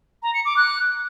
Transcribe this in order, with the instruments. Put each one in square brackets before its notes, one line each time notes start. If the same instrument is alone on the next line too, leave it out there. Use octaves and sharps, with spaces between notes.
[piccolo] A#5
C#7
D6
F#6